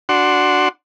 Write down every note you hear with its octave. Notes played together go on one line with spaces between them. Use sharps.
D4 F#4 F#5 C6